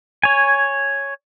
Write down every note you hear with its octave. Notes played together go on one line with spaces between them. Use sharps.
C#5 G#5